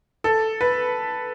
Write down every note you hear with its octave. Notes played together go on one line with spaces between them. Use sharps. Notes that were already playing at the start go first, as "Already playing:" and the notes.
A4
B4